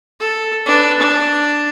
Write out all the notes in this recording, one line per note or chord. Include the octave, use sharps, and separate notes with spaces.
A4
D4 B4
D4